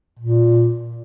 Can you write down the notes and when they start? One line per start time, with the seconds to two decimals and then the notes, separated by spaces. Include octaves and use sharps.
0.20 A#2